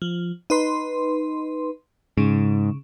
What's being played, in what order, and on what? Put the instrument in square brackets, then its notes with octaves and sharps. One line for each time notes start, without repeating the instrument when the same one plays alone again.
[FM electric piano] F3
D#4 B4 C6
[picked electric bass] G#2 [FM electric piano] C#3